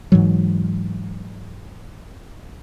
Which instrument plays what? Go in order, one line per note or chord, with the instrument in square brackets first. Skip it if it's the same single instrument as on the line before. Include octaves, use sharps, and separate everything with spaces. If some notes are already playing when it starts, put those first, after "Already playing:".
[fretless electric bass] G#2 E3 F#3